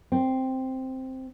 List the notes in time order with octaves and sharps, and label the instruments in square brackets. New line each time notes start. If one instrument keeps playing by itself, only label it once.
[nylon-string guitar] C4